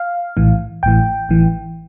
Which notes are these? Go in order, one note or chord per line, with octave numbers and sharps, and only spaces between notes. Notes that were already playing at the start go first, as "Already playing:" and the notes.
Already playing: F5
A#1 A2 E3
A1 A2 E3 G5
A1 A2 E3